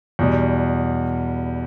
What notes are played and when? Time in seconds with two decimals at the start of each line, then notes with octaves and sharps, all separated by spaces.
0.19 E2 B2 G3